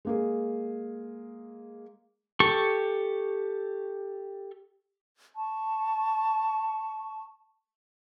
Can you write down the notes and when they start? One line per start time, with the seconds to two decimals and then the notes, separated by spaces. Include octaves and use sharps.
0.05 G#3 A#3 G#4
2.40 G4 A4 C#6
5.35 A5 C#6